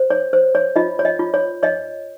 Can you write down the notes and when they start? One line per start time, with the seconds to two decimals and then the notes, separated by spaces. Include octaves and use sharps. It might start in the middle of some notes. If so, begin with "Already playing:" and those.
Already playing: C5
0.10 C#5
0.33 C5
0.55 C#5
0.76 F4 D#5
0.99 C#5
1.05 D#5
1.19 F4
1.34 C#5
1.63 C#5 D#5